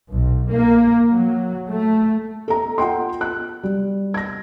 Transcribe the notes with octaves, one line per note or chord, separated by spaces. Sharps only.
B1
A#3
F#3
A3
A4 A#5
F4 F#5 G5 C6
F#6
G3
G#6 A#6